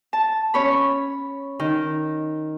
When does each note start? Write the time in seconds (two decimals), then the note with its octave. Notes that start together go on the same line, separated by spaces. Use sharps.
0.13 A5
0.54 C#4 C#5 B5
1.59 D#3